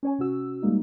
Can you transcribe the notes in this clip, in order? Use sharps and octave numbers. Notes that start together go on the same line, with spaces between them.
C#4 C#5 G#5
C3 C#4 F#4 E6
G3 G#3 A#3 D#4